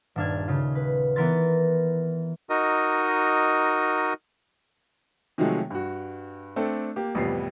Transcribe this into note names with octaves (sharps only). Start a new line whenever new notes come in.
D#1 G2 D4 F5 G#6
C#3 F4
B4
E3 B3 A#4 B4 C6 A6
D#4 F#4 A#4 D#5
C3 D#3 F3 F#3 G#3 A3
G2 F#4
A3 C4 D4 A4 D5
A#3 G4
A1 F2 C3 G3 B3 C7